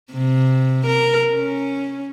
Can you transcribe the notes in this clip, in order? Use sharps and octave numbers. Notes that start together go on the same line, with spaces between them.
C3
A#4
C#4